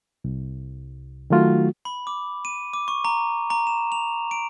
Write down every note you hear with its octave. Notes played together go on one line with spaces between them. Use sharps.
C2
D#3 F#3 A3 F4 F#4
B5
D6
D#7
D6
C#6
A#5
A#5
E7
F7
D7